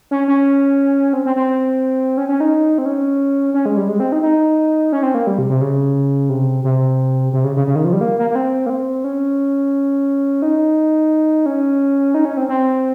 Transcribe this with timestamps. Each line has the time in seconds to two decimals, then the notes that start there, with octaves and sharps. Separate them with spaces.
0.11 C#4
0.28 C#4
1.13 C4
1.26 C4
1.36 C4
2.17 C#4
2.29 C#4
2.40 D#4
2.78 C4
2.85 C#4
3.54 C#4
3.66 G#3
3.77 G3
3.88 G#3
4.00 C4
4.12 D#4
4.23 D#4
4.92 C#4
5.03 C4
5.15 A#3
5.27 G3
5.38 C3
5.49 C3
5.61 C#3
6.30 C3
6.64 C3
7.33 C3
7.44 C#3
7.56 C#3
7.67 C#3
7.75 D#3
7.85 F3
7.93 G3
8.01 A#3
8.19 A#3
8.30 A#3
8.35 C4
8.66 A#3
8.70 C4
9.04 C#4
10.42 D#4
11.46 C#4
12.14 D#4
12.25 C#4
12.37 C4
12.49 C4